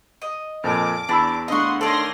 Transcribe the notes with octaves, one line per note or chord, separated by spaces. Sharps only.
D#5
F2 A#2 A5 D6 F6
E2 D4 A5 B5 E6 A6
A3 D4 D#5 F5 F#5 C6 C#6
D#3 A4 C#5 D5 C6 A#6